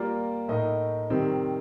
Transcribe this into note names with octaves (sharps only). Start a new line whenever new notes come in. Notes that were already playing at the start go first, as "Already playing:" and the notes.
Already playing: G3 A#3 F4 A#4 D5
A2 A3 D#4 A#4 D#5
C3 D#3 G3 C4